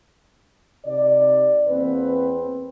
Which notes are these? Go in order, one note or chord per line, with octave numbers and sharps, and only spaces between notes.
C3 D#4 D5
E2 A#3 C4 B4